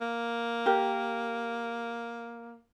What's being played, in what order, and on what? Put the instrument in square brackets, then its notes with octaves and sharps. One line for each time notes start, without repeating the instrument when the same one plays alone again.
[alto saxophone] A#3
[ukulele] G4 A#4